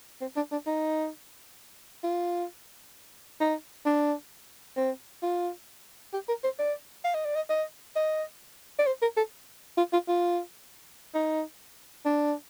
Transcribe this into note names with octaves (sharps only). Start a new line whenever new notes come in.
C4
D4
D4
D#4
F4
D#4
D4
C4
F4
G4
A#4
C5
D5
F5
D#5
D5
D#5
D#5
D#5
D5
C5
A#4
A4
F4
F4
F4
D#4
D4